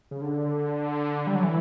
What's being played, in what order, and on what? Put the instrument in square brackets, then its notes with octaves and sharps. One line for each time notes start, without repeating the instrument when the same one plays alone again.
[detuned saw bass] C#3
D3
G3
F#3
E3